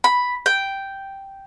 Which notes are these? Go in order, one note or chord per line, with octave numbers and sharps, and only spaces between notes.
B5
G5